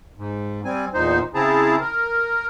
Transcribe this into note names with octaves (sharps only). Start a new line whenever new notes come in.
G#2
G3 C4 G#5
E2 A#2 D#4 C5
C#3 C4 E4 G#4 A5 A#5
A#4